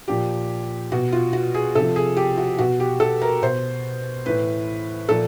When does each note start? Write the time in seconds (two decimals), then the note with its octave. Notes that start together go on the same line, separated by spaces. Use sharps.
0.08 A#2 F3 G4
0.92 B2 F#4
1.12 F4
1.33 F#4
1.54 G#4
1.75 C3 F3 A4
1.96 G#4
2.17 G4
2.38 F#4
2.59 B2 F#4
2.80 G4
3.00 A4
3.22 A#4
3.42 B2 C5
4.26 A2 E3 B4
5.09 A#2 F3 A4